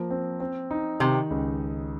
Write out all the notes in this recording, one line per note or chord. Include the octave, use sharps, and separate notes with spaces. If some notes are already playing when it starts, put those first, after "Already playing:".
Already playing: F3 A#3
C4
C4
D#4
C3 D#3
C#2